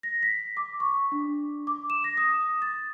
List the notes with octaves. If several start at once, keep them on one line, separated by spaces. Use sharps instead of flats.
A#6
B6
D6
C#6
D4
D6
E7
A#6
D#6
A6